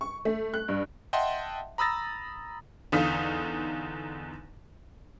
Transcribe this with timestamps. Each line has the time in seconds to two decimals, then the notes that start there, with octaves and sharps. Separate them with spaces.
0.01 C#6
0.25 A3
0.54 F#6
0.68 G2
1.13 D#5 E5 F#5 G5 A5 C6
1.78 A#5 B5 D#6 E6 A6 A#6
2.92 E2 D3 D#4 F5 D#6 B6